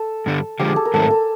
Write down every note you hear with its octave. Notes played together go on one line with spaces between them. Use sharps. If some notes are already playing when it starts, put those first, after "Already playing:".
Already playing: A4
G2 D3 G3
D3 F3 G#3 G4
G#4
A4
A#4
G#2 D#3 F#3 A3 C4 A4
A4